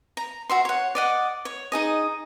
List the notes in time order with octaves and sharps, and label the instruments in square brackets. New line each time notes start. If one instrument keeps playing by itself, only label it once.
[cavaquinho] A#5
F#4 E5 C6
C#5 F#5
D5 D#5 F#5
C#5
D#4 G#4 D#5